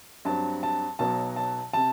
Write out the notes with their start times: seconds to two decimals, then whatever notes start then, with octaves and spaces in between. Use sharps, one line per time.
0.25 G2 F#3 C4 A5
0.63 A5
0.99 B1 B2 F#3 B3 A5
1.36 A5
1.73 C3 A5